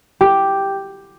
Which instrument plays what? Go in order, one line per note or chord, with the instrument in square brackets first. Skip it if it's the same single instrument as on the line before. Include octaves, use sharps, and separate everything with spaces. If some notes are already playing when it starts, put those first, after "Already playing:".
[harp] G4